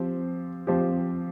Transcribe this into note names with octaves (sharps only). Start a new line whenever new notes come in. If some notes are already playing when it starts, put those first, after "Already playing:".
Already playing: F3 C4 G4
F3 C4 G4